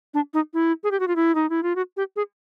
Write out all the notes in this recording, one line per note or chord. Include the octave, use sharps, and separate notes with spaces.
D4
D#4
E4
G#4
G4
F#4
F4
E4
D#4
E4
F4
F#4
G4
G#4